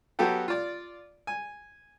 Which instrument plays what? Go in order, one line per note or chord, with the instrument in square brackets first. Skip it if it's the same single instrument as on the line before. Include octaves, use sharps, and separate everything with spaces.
[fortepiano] F#3 B3 F#4 G4 A4 G5
F4 D5
G#5